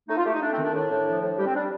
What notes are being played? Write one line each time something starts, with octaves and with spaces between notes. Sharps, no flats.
A3 D#4
F4
A3 G4
D#4
A3 D4
C4
D#3
D4
A2 D4
A2
F3
A2
G3 G4
C4
G3 D4